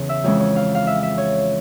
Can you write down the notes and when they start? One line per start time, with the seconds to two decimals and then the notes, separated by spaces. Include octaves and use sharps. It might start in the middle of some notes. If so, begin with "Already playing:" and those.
Already playing: E2 C#3 E3
0.09 E5
0.24 F2 E3 G#3 C#4 C#5
0.40 C#5
0.56 F5
0.75 F5
0.87 E5
1.03 E5
1.18 C#5